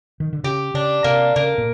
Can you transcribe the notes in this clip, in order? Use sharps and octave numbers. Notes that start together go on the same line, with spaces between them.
D#3
D3
C#3 G4
C#3 D4
C3 A#3
C#3 A#3
A#2